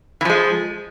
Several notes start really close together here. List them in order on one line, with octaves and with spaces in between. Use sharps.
E3 F3 G#3